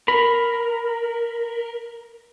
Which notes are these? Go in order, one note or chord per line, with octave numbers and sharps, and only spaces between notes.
A#4 B5